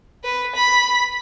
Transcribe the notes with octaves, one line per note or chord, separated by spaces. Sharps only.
B4
B5